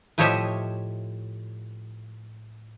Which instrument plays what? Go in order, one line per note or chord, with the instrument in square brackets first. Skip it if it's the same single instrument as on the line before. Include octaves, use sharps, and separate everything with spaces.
[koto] A2 F3 G4 C#5 D#5 E5